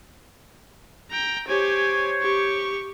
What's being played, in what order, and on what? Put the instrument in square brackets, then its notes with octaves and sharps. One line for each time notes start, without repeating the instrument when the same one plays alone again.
[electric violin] G5 A#5
[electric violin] G4 G#5 [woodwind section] C5 C#5
[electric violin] G4 C#6